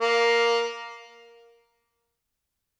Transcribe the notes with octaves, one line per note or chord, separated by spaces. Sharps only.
A#3